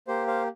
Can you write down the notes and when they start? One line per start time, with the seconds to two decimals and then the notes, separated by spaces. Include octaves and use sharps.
0.07 A#3 G4 C5
0.27 C5 F5